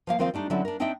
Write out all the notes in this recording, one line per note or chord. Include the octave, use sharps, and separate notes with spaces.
F3 A#3 F5
D#3 F3 C4 C5 E5 F5
G3 A3 D4 D#4
D3 F#3 C4 C#4 E4 A4
D4 A#4
C4 D4 D#4 D#5 E5 G5